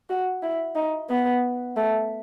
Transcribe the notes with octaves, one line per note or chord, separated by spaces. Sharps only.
F#4
E4
D#4
B3
A3